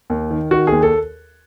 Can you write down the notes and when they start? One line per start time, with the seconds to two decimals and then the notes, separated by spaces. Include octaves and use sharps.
0.10 D#2
0.31 D#3
0.51 D#3 F#4
0.67 D#2 G#4
0.83 A4